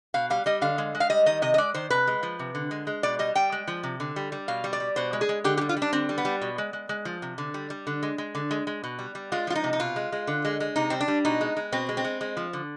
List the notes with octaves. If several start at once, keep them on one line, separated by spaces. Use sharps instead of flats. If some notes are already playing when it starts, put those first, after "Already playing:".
B2 F5
G3 F5
G3 D#5
D3 F5
G#3
G#3
F5
G3 D#5
D#3 D#5
C3 D#5
D#5
G#3 D5
D#3 C5
C3 B4
G#3
F3
C3
D3
G#3
G#3
B2 D5
G3 D#5
G3 G5
G#3
F3
C3
D3
G3
G3
B2 F5
G3
D5
G3
B2 C5
G#3
G#4
G#3
D3 G4
G4
G3
F4
G3
D4
D3 C4
G3
B3
G3
B2
G#3
G#3
G#3
F3
C3
D3
G3
G3
D3
G#3
G#3
D3
G#3
G#3
B2
G3
G3
G#3 F4
F3 F4
D#4
C3
D#4
B2 F4
G#3
G#3
D3
G#3
G#3
C3 D#4
G3 C4
D4
G3
B2 D#4
G#3
G#3
B2 C4
G#3
C4
G#3
G#3
F3
D3